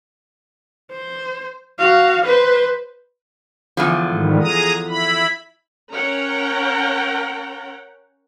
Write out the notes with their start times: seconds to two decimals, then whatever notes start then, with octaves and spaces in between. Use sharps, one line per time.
0.91 C5
1.79 F#4 F5
2.25 B4 C5
3.77 E2 D3 F3
4.09 G#2 D#3 G3
4.42 G#4 A#5 D#6
4.88 E4 B5
5.93 C#4 A#4 C#5 F#5 G5 A#5